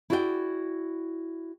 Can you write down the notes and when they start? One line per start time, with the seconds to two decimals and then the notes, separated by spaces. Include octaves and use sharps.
0.10 E4 F#4 G#4 D5 F5 G5